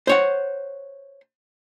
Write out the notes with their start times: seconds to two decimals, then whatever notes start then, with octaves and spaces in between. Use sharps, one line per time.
0.07 C5 C#5 F#5